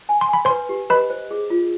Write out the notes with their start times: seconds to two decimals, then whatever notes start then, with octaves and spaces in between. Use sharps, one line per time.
0.09 G#5
0.21 C6
0.29 G#5 B5
0.45 B4 C5 C6
0.69 G4
0.90 B4 D#5 B5
1.10 C5
1.31 G#4
1.50 F4